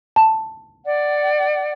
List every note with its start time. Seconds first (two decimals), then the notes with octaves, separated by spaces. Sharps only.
0.16 A5
0.85 D5 F#5